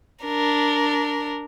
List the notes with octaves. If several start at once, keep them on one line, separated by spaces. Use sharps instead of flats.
D4 A#4